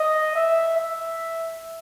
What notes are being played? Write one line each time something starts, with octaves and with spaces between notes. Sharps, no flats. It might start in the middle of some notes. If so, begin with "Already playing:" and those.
Already playing: D#5
E5
E5